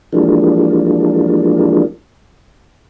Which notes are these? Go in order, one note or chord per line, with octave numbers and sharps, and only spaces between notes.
E3 F3 G3 G#3 A#3 D4